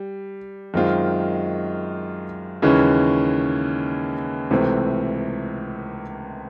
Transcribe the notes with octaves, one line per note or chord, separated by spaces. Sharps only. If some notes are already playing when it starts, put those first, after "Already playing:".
Already playing: G3
F#2 D#3 G#3 C4 F4
D#2 C#3 E3 G#3 C#4
C#2 C3 E3 A3 C4